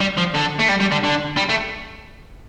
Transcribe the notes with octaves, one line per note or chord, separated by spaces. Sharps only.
G3
F3
D3
A3
G3
G3
D3
D3
G3
A3